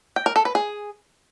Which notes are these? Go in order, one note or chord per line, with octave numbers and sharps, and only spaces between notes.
G5
A#4
A4
B4
G#4